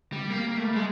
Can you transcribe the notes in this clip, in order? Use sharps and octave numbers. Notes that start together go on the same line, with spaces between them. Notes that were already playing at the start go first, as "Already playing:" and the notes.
G3
A#3
A#3
A3
G3
G#3